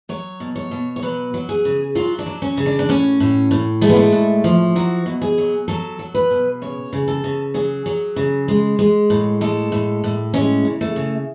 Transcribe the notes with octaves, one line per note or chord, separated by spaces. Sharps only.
F#3 C#5
B2
C#5
B2
C#5
F#3 B4
F#3
G#4
C#3
F#3 F4
D4
F#3
C#4
C#3
D4
D4
A2 C#4
A2
A2
G#3 A3
B3
A3
A2
F3
F#3 F#4
B2
G#4
F#3
F#3 A4
F#3
B4
B2
C#3 C#5
C#3
A4
C#3
F#3 G#4
F#3
C#3
G#3
G#3
A2
G#3 A4
A2
A2
G#3 C#4
C#3
A3
C#3